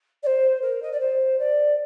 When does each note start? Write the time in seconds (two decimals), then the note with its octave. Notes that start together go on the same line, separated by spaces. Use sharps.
0.23 D5
0.26 C5
0.61 A#4
0.82 D#5
0.92 D5
1.00 C5
1.39 D5